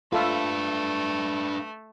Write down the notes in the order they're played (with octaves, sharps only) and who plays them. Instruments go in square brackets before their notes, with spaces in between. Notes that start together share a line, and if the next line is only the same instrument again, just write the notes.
[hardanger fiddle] A3 [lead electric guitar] D4 B4 [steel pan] F4 A4 E5